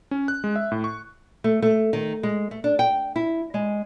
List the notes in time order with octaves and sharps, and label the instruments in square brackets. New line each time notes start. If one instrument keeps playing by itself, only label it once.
[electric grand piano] C#4
F#6
G#3
E5
A2
C#6
[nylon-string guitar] A3
A3
D#3
G#3
A3
D4
G5
E4
G#3